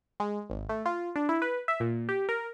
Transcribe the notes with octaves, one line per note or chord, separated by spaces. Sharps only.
G#3
G#1
A3
F4
D4
E4
B4
E5
A#2
G4
A#4